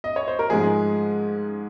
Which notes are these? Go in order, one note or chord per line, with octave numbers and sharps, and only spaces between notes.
D#5
C#5
C5
A#4
G#2 F3 G#3 G#4